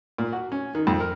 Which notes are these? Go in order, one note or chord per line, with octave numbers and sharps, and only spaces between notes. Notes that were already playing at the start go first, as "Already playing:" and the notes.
A#2
F#4
C#4
D#3
F2
A#4